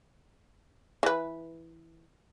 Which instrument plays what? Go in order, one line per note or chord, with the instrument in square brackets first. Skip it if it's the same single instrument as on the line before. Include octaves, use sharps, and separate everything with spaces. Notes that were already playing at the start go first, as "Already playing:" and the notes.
[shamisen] E3 B4